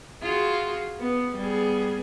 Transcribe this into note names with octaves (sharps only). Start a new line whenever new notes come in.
F4 F#4 G#4
B3
G3 B3 G#4